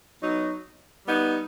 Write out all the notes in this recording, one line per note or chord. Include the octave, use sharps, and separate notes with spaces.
F#3 B3 D#4
G3 B3 D#4